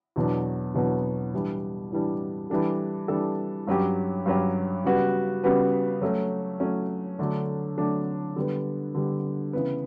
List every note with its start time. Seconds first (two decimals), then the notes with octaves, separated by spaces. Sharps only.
0.16 E2 B2 F#3 B3 D4
0.74 E2 B2 F#3 B3 D4
1.33 A2 E3 G3 D4
1.92 A2 E3 G3 D4
2.50 E3 G3 D4 A4
3.08 E3 G3 D4 A4
3.67 G2 F#3 C#4 G4
4.26 G2 F#3 C#4 G4
4.84 C#3 G3 B3 F#4 B4
5.44 C#3 G3 B3 F#4 B4
6.01 F#3 A3 C#4
6.60 F#3 A3 C#4
7.19 D3 F#3 A3 D4
7.77 D3 F#3 A3 D4
8.36 D3 G3 B3
8.94 D3 G3 B3
9.53 C#3 E3 B3